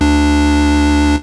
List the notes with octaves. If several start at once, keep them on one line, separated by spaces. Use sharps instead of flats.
D2 D4